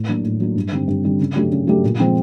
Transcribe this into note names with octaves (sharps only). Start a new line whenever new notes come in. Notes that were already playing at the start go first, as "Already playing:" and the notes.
Already playing: A2
F#3 A#3 D4
A2
F#3 A#3 D4
G2
D3 G3 C4
G2
D3 G3 C4
C#3
F#3 A3 D4 G4
C#3
F#3 A3 D4 G4
A#2
F3 G#3 C4